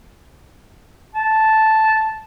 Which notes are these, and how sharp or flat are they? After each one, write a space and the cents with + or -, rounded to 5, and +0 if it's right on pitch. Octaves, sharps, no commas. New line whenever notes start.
A5 -5